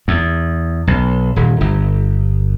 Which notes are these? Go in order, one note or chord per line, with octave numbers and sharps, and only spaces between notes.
E2
B1
D#1
G1